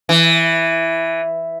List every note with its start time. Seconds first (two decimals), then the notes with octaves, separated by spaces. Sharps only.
0.09 E3